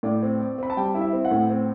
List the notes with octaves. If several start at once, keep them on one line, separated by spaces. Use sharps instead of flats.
A2 D5
C4
C4
C4 B5
A5
G3 G5
E4
E5
C4
F#5
A2
C4